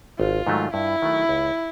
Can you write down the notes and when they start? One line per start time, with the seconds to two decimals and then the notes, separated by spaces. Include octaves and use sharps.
0.19 G#1 F4
0.47 G#2 D#3 F#3 A3
0.74 G2 E4
1.02 D#3 F#3 A3
1.29 C#2